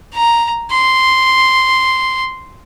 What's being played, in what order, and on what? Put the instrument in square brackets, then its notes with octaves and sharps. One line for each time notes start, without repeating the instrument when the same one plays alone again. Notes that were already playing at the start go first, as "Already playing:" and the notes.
[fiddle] A#5
C6